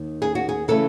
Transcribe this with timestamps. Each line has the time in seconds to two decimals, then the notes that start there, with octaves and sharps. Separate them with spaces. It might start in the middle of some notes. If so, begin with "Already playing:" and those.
Already playing: D#2 D#3
0.22 G#4
0.35 F#4
0.49 G#4
0.68 C#3 E3 A3 A4